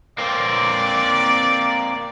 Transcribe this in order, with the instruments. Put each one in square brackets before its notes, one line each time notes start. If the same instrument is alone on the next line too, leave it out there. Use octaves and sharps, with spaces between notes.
[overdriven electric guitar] A#3 C4 [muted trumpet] D5